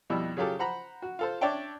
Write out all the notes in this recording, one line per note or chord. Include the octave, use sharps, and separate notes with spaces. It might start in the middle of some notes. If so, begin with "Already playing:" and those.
F2 B2 G3 E4
C#3 F#3 F4 G4 A4
C5 F#5 A#5 B5
F#4
F4 A4 C5
D4 C#5 D5 E5 G5 A5